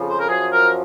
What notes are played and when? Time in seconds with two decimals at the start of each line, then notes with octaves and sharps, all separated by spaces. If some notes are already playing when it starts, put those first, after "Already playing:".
Already playing: F2 C#3 F3
0.09 C5
0.19 A#4
0.29 F#2 F3 G#4
0.52 A#4